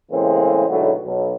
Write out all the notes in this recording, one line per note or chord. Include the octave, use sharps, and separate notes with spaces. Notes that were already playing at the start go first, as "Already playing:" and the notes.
A2 C#3 E3 G#3 A#3 C4
B1 A2 D3 F#3 G#3 B3
B1